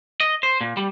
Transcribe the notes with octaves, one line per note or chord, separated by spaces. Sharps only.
D#5
C5
A#2
G3